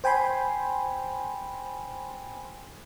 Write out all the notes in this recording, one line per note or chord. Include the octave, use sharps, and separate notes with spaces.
C5 G5 G#5 B5 C6